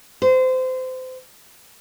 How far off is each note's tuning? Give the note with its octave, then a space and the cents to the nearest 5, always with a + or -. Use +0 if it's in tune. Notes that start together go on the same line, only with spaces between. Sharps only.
C5 -25